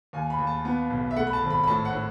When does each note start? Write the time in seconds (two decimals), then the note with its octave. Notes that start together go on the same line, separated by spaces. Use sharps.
0.13 D#2 G#5
0.30 B5
0.39 D#2
0.47 A5
0.65 B3
0.90 B1
1.11 E5
1.16 A3 F#5
1.27 B5
1.33 A5
1.42 G#1
1.50 B5
1.64 B5
1.67 A2 A5
1.85 F#5
1.93 A2